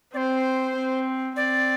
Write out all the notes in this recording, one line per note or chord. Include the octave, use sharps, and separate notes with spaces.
C4 C5 D5
C4
C4 D5